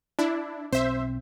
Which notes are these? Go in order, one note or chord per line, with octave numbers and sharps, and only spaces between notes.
D4 E4
B1 C4 C5 E5